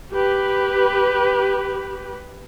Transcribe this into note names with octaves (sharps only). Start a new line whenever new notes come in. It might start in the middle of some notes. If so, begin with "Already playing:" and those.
G4 B4